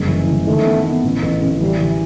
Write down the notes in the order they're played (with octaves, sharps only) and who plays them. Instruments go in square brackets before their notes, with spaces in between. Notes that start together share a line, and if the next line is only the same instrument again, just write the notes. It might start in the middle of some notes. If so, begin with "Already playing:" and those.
Already playing: [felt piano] F#1 G2
E3
E3
[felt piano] D#3 [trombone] A3
[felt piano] B3
B3
A1
A1
A1
[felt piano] E3 [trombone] G3
[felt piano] E3